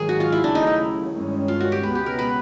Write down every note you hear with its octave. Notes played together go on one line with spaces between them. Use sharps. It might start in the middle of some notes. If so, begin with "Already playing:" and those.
Already playing: G#2 D#3 F#3 G#4
F#4
F4
E4
D#2 C#3 F#3 A3 D4
D#4
E4
G2 D#3 G#3 C#4
F4
F#4
G4
C#2 B2 G#3 B3 B4
G4
A#4
B4